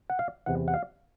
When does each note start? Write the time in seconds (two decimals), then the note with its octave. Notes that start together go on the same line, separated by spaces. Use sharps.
0.10 F#5
0.19 F5
0.46 E2 C3 E3 F#5
0.68 F#5
0.74 F5